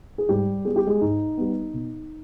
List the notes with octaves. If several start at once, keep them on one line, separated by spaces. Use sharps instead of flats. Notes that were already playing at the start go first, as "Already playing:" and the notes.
G#4
G#2 G3 G4
G3 B3 G#4
G4
G#3 G#4
G#2 D#4
G3 B3
B2